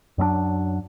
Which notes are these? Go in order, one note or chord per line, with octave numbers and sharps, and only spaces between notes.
F#2 F#3 A3 D4